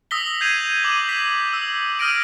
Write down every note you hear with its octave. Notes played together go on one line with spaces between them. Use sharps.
D#6 E6 A#6 B6 G7
G6 G#6 C7 D#7 F7
D6 D#7 F#7
B6
E6
D#6 F6 G6 A#6 D7 D#7